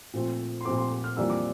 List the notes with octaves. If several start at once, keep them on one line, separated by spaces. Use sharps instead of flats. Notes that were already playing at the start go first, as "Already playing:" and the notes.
A#2 F3 A3 C4
C6
A#2 F3 A3 C4 D6
C6
F6
F2 E3 G3 A#3 D4 E6
D6